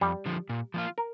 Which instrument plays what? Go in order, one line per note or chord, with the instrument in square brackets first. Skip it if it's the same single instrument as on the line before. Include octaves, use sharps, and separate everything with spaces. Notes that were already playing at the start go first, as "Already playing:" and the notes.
[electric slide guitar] F2 [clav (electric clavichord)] G3
[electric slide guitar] D3 F3
A#2
F3 A#3 F4
[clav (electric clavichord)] A#4